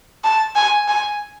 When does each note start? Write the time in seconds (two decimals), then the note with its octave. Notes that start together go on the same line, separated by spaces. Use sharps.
0.24 A5
0.56 G#5
0.88 G#5